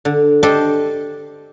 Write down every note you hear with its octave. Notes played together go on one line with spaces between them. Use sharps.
D3
D4 G4 A4 C5 D#5